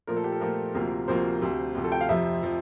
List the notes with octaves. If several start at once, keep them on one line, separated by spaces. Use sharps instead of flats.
A#2 F3 A3 A#4
A4
G4
A4
A#2 F3 A3 A#4
D2 C3 F3 A#3
D2 C3 F3 A#3 C5
D2 C3 F3
D2 C3 F3
A4
G5
F5
F2 C3 F3 E5
C3 F3